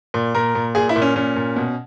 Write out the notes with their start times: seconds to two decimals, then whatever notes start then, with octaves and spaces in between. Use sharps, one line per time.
0.14 A#2
0.35 A#2 A#4
0.55 A#2
0.75 A#2 G#4
0.89 E4
0.96 A#2
1.02 C#4
1.16 A#2 C#4
1.36 A#2
1.56 B2